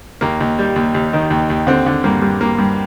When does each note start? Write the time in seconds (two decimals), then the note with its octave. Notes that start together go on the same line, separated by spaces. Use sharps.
0.21 D#2 A#3
0.40 D#2
0.59 G3
0.76 D#2
0.94 D#2
1.13 D#3
1.30 D#2
1.50 D#2
1.67 D3 C4
1.86 D3
2.04 G2 A#3
2.22 G2
2.40 G2 A#3
2.58 G2